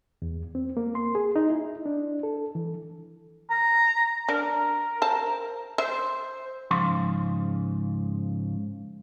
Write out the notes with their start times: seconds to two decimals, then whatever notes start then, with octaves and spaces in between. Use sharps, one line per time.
0.22 E2
0.55 C4
0.77 A#3
0.95 C6
1.15 G#4
1.36 D#4
1.50 E4
1.86 D4
2.23 A4
2.55 E3
3.50 A#5
4.28 D4 A#4
5.02 C5 A5
5.78 C5 E5
6.71 G#2 C#3 F3 F5 C6